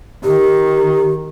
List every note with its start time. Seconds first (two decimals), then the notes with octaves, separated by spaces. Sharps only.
0.24 D#3 G4